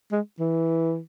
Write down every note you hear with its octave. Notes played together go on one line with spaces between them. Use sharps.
G#3
E3